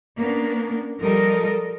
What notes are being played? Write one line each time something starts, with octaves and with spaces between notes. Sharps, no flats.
A#3 B3 C#4 D4
F3 G3 A4 A#4 D#5